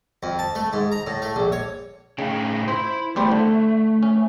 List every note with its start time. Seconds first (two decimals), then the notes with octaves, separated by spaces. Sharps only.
0.23 F2
0.39 A5
0.55 A3
0.73 G#2
0.92 A#5
1.07 A2
1.22 A3
1.36 A#1
1.52 C#5
2.19 A2 C#3 D#4 G5
2.68 E4 C5
3.16 E2 G3 A3 C5
3.32 D3
4.03 C#4